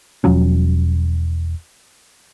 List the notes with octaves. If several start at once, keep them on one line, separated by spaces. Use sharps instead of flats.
E1 F3 F#3 C#4